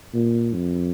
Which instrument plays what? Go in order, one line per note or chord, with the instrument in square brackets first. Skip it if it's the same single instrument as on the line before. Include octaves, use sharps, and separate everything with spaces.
[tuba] A#2
F2